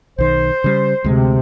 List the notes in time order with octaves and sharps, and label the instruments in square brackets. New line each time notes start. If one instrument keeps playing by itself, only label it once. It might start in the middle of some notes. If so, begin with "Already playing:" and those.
[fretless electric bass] B1 D#3 [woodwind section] C5
[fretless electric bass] C#3 G3
[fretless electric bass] D2 G#3 [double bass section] C3